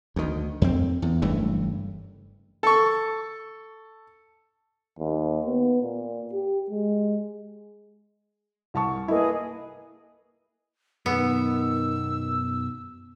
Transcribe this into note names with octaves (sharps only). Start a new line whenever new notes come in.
D2 D#3
F2 C4
E2
F#1 G2 E3 A3
A4 C#6
D#2
B3
A#2
G4
G#3
C2 A5 C#6
A#3 E4 G#4 B4 D#5
F#2 B2 D#3 B3 E6